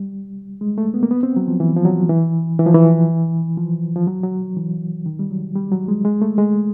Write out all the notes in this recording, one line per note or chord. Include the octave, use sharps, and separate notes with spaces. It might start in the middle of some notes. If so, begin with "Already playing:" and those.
Already playing: G3
G#3
A3
B3
A#3
B3
C4
F#3
F3
E3
F3
F#3
E3
E3
F3
E3
F3
F3
F#3
F#3
E3
D#3
G3
F#3
G3
F#3
G#3
G#3
A3
G#3